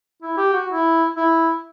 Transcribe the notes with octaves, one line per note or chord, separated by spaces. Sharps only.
E4
G4
F#4
E4
E4